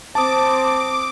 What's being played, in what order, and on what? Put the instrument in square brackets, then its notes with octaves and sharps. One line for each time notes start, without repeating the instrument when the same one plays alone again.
[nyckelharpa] C4 [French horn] C5 [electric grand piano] A5 D#6 [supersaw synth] D6